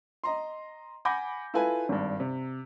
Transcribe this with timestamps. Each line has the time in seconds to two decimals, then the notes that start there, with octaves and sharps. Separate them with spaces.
0.24 D#5 A#5 C6
1.05 F#5 G#5 B5 D6 G6 A#6
1.54 E4 F4 A4 B4 G#5
1.89 G#1 G2
2.20 C3